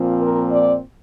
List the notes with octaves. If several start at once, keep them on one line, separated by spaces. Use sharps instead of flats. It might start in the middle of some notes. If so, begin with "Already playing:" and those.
Already playing: A#2 F3 C4
A#4
D5